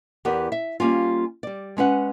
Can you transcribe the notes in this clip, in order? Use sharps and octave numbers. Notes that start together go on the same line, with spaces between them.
E2 B3 G4 A#4 D5
E5
G3 A#3 C#4 F4
G3 D5
G#3 C#4 B4 F#5